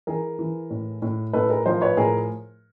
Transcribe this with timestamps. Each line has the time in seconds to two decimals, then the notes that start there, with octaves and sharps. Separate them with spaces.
0.07 E3 G#4 A#4
0.39 E3
0.70 A2
1.02 A2
1.33 A2 A4 B4
1.50 G#4 A#4
1.66 F3 A#4 C5
1.81 B4 C#5
1.97 A2 G#4 A#4